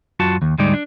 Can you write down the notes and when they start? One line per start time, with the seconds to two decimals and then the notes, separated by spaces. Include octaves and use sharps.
0.20 F#2 F4 F#4 A5
0.42 D#2
0.58 D2 G#2 G3 G#3 D#4 D5
0.74 D4